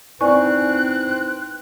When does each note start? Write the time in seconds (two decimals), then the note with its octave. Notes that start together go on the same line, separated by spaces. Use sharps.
0.21 C4 D#4 E4 B4 D5 G#5 C#6 F#6